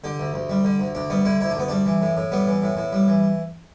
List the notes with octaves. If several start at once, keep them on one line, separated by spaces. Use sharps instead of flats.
D3 G4
D2
D2
G3
D3
D2
D2 D4
G3 B3
D3 E4
D2 E4
D4
D2 B3
G3 D4
E3
A2
A2
G3 B3
E3
A2
A2
G3
E3